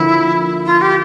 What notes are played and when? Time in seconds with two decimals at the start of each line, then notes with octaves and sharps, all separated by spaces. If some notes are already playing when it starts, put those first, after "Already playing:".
Already playing: D3 F3 A#3 E4
0.66 F4
0.81 G4